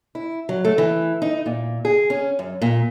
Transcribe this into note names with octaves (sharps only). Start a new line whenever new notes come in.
E4
F#3
A3
E3
D#4
A#2
G#4
C#4
F#2
A#2